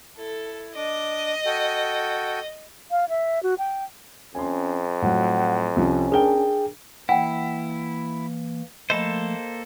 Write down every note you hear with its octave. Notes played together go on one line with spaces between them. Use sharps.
E4 A4
D4 D#5 D6
F#4 A4 G5
F5
E5
F#4
G5
F2 C#4 G#5 C6
A2 F#3 F#5
C2 F3 C#4
D4 G#4 A#4 G5 G7
E3 A#3 E4 F#5 G5
F3 A3 A#3 A4 C5 D#5 B5